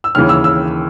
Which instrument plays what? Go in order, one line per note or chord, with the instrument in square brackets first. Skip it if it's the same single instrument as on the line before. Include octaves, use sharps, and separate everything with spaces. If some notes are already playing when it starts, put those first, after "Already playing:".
[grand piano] E6
D#2 C#3 E3 F6
E6
E6